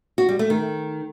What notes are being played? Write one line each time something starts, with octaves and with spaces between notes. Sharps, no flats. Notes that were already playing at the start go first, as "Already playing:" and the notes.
F#4
G3
A3
D#3